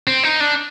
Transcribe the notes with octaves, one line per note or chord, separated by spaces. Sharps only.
C4
D#4
D4